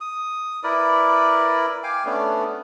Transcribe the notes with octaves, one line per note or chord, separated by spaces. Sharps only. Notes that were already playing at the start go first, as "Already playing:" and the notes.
D#6
E4 A#4 B4 D5
F5 G5 G#5 D6
A3 B3 C#4 D4